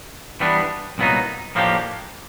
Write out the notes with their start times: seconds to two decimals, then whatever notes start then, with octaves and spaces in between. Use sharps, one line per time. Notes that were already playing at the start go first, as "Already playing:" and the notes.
0.40 E3 G3 B3 D4
0.98 C2 A#2 F#3 B3 D#4
1.55 A2 F3 A#3 D4 G4